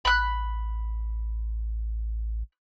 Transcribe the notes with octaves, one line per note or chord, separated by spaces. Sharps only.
A1 B5 F#6